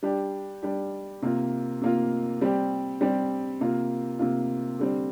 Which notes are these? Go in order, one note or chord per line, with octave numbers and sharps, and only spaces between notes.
G3 D4 G4
G3 D4 G4
C3 A#3 F4
C3 A#3 F4
G3 C4 G4
G3 C4 G4
C3 A#3 F4
C3 A#3 F4
D3 G3 C4